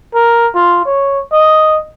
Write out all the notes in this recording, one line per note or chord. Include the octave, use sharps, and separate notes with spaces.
A#4
F4
C#5
D#5